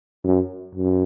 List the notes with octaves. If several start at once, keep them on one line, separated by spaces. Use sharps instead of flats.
F#2
F#2